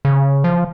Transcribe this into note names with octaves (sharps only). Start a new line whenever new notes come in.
C#3
F3